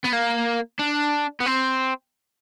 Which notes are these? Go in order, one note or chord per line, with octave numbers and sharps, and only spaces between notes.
B3
A#3
D4
B3
C4